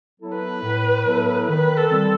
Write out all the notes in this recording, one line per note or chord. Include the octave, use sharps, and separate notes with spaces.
F#3 B3 E4 A4
B4
A2
F#3 B3 E4 A4
D#3 B4
A4
G3 C4